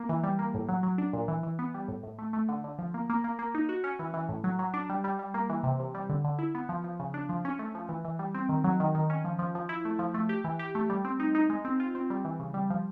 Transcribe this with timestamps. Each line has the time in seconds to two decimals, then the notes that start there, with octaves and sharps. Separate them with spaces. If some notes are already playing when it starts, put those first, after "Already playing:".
Already playing: A#3
0.09 E3
0.24 G3
0.39 A#3
0.54 A2
0.69 F#3
0.83 F#3
0.98 D4
1.13 A#2
1.28 E3
1.43 E3
1.59 B3
1.74 G3
1.88 A2
2.03 A2
2.19 A3
2.33 A3
2.49 D3
2.64 D3
2.79 F3
2.94 A#3
3.10 A#3
3.24 A#3
3.39 A#3
3.55 D#4
3.69 F#4
3.84 C#4
3.99 E3
4.14 E3
4.29 A2
4.44 F#3
4.59 F#3
4.74 D4
4.89 G3
5.04 G3
5.19 G3
5.34 A#3
5.50 E3
5.64 C3
5.79 C3
5.94 G3
6.09 D3
6.24 D3
6.39 E4
6.55 B3
6.69 F3
6.84 F3
7.00 C#3
7.14 D4
7.29 F3
7.45 C#4
7.59 A3
7.75 F3
7.89 E3
8.05 E3
8.19 G3
8.34 C4
8.49 D#3
8.64 F#3
8.80 D#3
8.95 D#3
9.10 C#4
9.25 F3
9.39 F3
9.55 F3
9.69 E4
9.85 A3
9.99 F3
10.14 A3
10.29 G4
10.44 E3
10.59 G4
10.75 A3
10.90 G3
11.05 C4
11.20 D#4
11.35 D#4
11.50 G#3
11.65 C4
11.80 F4
11.95 C4
12.10 G3
12.25 E3
12.40 C#3
12.54 G3
12.70 F3